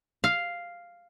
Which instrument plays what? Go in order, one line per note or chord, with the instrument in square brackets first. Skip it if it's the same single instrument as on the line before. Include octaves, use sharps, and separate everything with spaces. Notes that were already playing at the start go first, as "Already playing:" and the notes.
[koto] F5